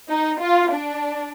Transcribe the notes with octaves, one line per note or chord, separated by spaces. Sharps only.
D#4
F4
D4